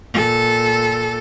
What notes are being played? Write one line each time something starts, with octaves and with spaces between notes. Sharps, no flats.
A#2 A4